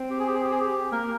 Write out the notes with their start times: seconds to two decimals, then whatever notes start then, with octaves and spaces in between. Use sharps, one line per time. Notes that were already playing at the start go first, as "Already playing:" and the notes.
Already playing: C4
0.10 G4
0.19 G#4
0.26 G4
0.34 G#4
0.44 G4
0.51 G#4
0.60 G4
0.92 A#3 A#4